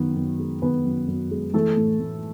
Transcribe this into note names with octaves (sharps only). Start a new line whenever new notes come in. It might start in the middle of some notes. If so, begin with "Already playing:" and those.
Already playing: F#2 D#3 B3
F#2
G#3
D#3 B3 B4
F#2
F#2
G#3
E3 A3 A4
A2
A2